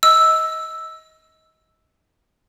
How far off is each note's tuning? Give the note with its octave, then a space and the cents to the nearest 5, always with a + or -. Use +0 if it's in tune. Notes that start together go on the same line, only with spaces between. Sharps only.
D#5 +25 E6 +0